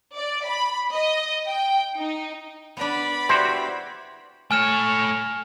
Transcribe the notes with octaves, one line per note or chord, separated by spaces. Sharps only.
D5
B5
D#5
G5
D#4
B3 D4 D5 B5
E4 F#4 G4 C5 C6
A3 C#5 G#5 F6 E7